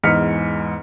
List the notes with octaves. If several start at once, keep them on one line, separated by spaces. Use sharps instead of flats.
E2 G#2 D#5 F6 B6 C#7